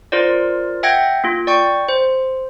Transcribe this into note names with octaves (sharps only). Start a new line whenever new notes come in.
F4 A#4 C5 D5
E5 F#5 G5 G#6 A#6
A#3 F4
D5 G5 C#6
C5